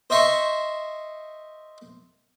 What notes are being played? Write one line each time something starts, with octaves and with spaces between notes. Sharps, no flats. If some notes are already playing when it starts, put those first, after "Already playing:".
C5 D#5 E5 C6 C#6